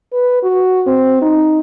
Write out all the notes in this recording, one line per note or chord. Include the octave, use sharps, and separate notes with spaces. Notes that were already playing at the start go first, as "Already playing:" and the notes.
B4
F#4
C4
D#4